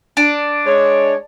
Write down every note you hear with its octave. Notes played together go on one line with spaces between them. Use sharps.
D4
G#3 C#5